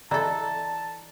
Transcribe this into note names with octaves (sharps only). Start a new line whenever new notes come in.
E3 A4 D5 D#5 A5 A#5